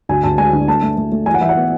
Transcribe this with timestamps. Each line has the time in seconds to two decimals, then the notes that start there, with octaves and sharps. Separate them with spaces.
0.09 D2 G#5
0.24 D2 A5
0.38 G#3 G#5
0.53 D3
0.68 A3 A5
0.82 A3
0.97 A3
1.12 A3
1.26 E3 G#5
1.34 F#5
1.41 E3 E5
1.49 F#5
1.56 B3